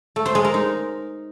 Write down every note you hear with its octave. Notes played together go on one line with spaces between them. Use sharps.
A3
C5
G#3
A#4
D#4